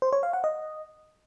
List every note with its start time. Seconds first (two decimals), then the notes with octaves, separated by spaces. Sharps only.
0.02 C5
0.13 C#5
0.23 F5
0.33 F#5
0.44 D#5